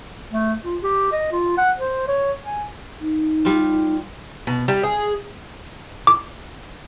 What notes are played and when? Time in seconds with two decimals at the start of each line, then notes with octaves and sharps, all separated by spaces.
0.32 A3
0.65 F4
0.83 G4
1.12 D#5
1.32 F4
1.57 F#5
1.78 C5
2.08 C#5
2.45 G#5
3.00 D#4
3.45 G3 F4
4.47 B2
4.68 G3
4.83 G#4
6.07 D6